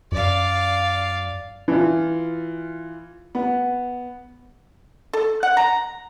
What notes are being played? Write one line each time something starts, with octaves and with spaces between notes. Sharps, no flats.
F#2 D5 F5
E3 F4
B3
A4
F#5
A#5